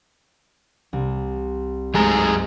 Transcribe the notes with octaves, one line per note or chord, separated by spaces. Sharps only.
C2
F#2 G#3 A3 G#4 C5 A#5
A#6